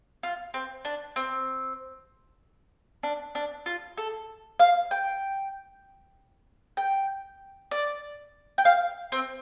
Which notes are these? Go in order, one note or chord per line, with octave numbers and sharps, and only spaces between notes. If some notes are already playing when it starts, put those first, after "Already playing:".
F4
C4
D4
C4
D4
D4
F4
A4
F5
G5
G5
D5
G5
F5
C4